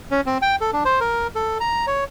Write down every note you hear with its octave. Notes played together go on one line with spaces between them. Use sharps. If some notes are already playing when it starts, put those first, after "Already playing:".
C#4
C4
G5
A4
D4
C5
A#4
A4
A#5
C#5